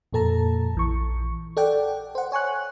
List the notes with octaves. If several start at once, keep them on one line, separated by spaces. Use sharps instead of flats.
F2 A#2 A4 A5 A#5
A#1 E3 C#6
A4 D5 F#5 G5
C5 F#5
C#5 G#5 C#6 F#6